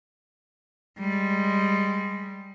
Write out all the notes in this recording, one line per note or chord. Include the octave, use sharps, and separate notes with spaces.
G3 G#3